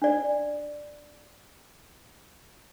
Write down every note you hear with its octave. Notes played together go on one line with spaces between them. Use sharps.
D4 D5